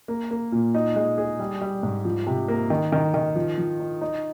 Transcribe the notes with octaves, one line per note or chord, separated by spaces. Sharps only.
A#3
A#3
A#2
D#4
G#3
G#4
G3
G3
G#2
F3
C3
A#3
D#3
D#3
D#3
F3
F3
D#4
D#4